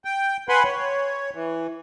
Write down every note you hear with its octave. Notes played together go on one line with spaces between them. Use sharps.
G5
B4 F#5 G#5 B5 C6
C#5
E3